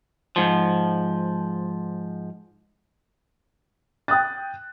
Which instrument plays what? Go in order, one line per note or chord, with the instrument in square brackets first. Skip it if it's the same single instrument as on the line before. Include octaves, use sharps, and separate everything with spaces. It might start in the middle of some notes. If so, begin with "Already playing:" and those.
[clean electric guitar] G#2 F3
[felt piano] G5 D#6 F#6 A6